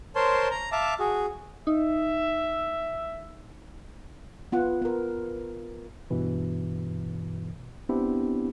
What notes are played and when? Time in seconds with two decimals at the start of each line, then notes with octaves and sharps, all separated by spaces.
0.16 A#4 C5 C#5 A5 C6
0.51 A#5
0.72 E5 F5 A5 D6
0.99 F#4 G#4
1.67 D#4 E5
4.52 B3 F4 F#5
4.82 B3 A#4
6.10 G2 B2 E3
7.89 B3 C4 D4 E4 G4